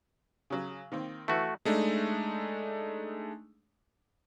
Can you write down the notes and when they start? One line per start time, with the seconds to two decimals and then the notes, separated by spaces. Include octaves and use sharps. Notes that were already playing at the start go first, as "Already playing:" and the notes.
0.50 C#3 F#3
0.92 D#3 A#3 C4
1.28 E3 A3 F#4
1.65 G#3 A3 D4 D#4